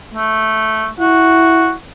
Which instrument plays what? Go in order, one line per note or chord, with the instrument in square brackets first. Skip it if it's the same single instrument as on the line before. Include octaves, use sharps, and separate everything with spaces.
[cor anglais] A3
[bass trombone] E4 [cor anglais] F#4